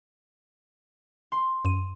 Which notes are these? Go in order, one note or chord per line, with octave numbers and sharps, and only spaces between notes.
C6
F#2 D#7